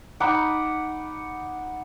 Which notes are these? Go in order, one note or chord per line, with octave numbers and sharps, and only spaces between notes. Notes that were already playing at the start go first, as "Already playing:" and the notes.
D#4 F#5 B5 D6